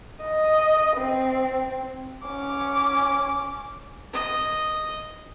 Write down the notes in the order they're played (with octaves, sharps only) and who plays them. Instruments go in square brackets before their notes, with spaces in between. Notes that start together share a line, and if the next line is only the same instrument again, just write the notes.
[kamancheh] D#5
C4
C#4 D6
[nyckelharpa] D#5 D#6